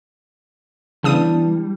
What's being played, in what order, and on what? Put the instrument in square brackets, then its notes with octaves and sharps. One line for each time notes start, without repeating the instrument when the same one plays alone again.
[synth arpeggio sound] C#3 D#6 D#7 [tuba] E3 [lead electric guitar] G3 [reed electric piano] B3 D4 A5